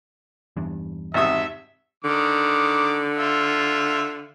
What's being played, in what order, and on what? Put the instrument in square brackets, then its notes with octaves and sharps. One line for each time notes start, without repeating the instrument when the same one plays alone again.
[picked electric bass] E2 G2
[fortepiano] G#1 C3 D#6 [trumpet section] E5
[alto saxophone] D3 [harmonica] D#3 D6
[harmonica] F4 E5